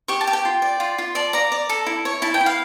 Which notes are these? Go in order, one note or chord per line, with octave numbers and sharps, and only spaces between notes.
G4 C#6
A5
G4
G5
F4
D5
F4
F4
D5 A5
D5 A#5
D5
A4
E4
C#5
E4 A5
G5
E4
F5